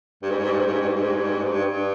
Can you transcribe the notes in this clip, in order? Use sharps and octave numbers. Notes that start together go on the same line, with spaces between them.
G2
G#2
G2
G#2
G2
G#2
G2
G#2
G2
G#2
G2
G#2
G2
G#2
G2
G#2
G2
G#2
G2
G2